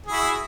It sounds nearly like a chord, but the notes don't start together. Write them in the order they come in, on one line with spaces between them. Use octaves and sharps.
G#4 F#4 E4